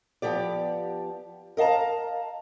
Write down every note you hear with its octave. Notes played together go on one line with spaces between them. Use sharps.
F3 B3 G4 D5
A#4 D#5 F5 A5 A#5